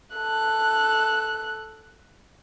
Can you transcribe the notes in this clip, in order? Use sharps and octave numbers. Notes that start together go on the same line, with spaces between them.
A4 F#6